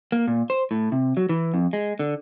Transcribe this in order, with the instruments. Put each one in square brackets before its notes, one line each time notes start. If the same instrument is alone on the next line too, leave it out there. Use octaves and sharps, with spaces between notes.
[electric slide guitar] A#3
A#2
C5
A2
C3
F#3
E3
F2
G#3
D3